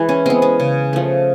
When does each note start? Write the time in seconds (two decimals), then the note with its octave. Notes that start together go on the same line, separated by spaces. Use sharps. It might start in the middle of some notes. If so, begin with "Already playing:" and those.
Already playing: E3 G#3
0.09 C#4
0.26 G#3 B3 C4
0.42 C#4
0.60 C#3
0.93 F3 A3